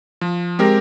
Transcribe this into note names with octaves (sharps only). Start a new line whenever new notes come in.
F3
G#3 C4 G4 A#4